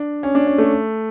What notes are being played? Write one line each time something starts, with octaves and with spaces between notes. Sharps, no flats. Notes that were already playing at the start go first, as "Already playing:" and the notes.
Already playing: D4
C#4
D4
C#4
A3